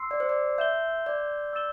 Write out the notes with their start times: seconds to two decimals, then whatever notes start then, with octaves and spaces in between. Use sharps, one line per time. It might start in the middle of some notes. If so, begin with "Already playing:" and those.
Already playing: C6 E6 C7
0.11 D5
0.20 C5
0.29 D5
0.58 E5 G6 E7 G7
1.06 D5
1.53 E6 A6 E7 G7